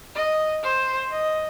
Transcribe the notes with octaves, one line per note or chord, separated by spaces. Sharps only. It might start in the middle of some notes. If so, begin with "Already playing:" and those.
D#5
C5
D#5